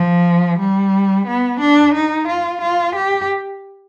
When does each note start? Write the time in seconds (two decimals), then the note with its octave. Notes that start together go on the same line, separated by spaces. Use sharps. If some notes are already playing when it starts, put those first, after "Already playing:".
Already playing: F3
0.59 G3
1.27 B3
1.61 D4
1.94 D#4
2.28 F4
2.62 F4
2.96 G4